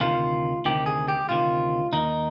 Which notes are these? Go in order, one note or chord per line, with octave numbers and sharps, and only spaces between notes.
D2 C3 D#3 F4
D2 C3 D#3 G4
G#4
G4
D2 C3 D#3 F4
D#2 D#3 D#4